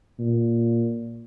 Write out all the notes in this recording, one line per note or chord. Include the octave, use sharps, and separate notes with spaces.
A#2